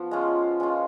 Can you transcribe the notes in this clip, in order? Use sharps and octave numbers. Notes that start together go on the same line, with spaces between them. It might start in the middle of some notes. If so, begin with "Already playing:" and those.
Already playing: F3 B3
G#3 C#4 F4
G#3 C#4 F4